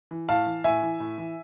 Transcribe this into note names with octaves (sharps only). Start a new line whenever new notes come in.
E3
A2 F5 A5
E3
A2 E5 G#5
E3
A2
E3